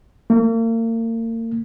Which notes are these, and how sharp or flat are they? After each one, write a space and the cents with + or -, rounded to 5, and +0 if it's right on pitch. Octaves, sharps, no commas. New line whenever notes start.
A#3 -40